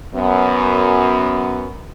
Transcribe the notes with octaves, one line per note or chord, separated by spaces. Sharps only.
F#2 B3